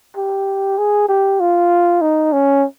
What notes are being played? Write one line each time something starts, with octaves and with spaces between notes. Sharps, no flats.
G4
G#4
G4
F4
D#4
C#4